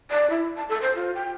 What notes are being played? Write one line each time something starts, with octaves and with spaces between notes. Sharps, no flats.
D5
E4
A5
A4
C5
F4
G5